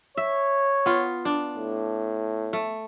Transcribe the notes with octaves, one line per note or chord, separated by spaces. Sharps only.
C#5 E5
B3 F4
D4
A2
A3